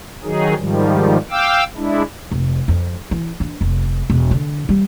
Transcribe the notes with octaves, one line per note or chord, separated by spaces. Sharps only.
D#3 F#3 D#4 G#4
G#2 D#3 F3 G3
F5 G5 D6 E6
G#3 D4 E4
F1
F2
E3
D4
F1
E1
D3
G3